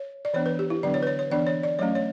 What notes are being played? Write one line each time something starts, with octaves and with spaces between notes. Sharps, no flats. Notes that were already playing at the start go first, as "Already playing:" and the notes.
Already playing: C#5
D5
E3 B3 D4 C#5
B4
G4
E4
D3 F#3 B3 D4 D5
C#5
B4
C#5
C#5
E3 B3 D4 D5
C#5
D5
F#3 A3 C#4 C#5
C#5